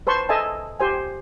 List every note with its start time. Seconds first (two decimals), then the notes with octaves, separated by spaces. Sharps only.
0.07 B4 C5 A5 C6 C#6
0.29 A4 D#5 E5 G#5 A5
0.80 G4 C5 G#5